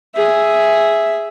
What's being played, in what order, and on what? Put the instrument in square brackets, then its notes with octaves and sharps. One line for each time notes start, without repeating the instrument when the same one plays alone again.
[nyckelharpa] G#4 E5